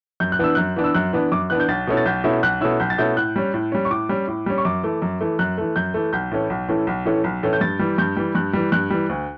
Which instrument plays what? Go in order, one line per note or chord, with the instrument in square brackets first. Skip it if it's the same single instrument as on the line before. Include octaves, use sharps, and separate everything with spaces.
[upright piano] F#2 G6
F#6
E3 B3 D4 E6
F#2 F#6
E3 B3 D4
E6
F#2 F#6
E3 B3 D4
F#2 D6
E3 B3 D4 F#6
G6
B1 A6
B2 A3 C#4 E4
A6
B1 G6
B2 A3 C#4 E4
B1 F#6
B2 A3 C#4 E4 E6
B1 G6
A6
B2 A3 C#4 E4 G6
A2 F#6
G3 C#4
A2
G3 C#4
C#6
A2 D6
G3 C#4
A2
G3 C#4
C#6
F#2 D6
E3 A3
F#2
E3 A3
F#2 F#6
E3 A3
F#2 G6
E3 A3
B1 G6
A2 E3 A3 C#4
B1
A2 E3 A3 C#4
B1
A2 E3 A3 C#4
B1
A2 E3 A3 C#4
G6
G2 A6
E3 G3
G2 G6
E3 G3
G2 F#6
E3 G3
G2 F#6
E3 G3
D2